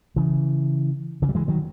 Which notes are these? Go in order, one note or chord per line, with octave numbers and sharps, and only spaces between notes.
C#3 E3
C#3 E3
F#3
E3 G#3
D#3 F#3